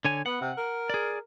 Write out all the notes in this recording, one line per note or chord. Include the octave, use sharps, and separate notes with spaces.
D3 C#5 G#5
B3 F#5
C3
A#4
G#4 D5